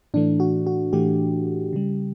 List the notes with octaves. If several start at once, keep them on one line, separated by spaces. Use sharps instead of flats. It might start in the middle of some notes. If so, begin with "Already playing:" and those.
A2 E3 A3 D4
F#4
F#4
A2 E3 A3 G4
C#3 G3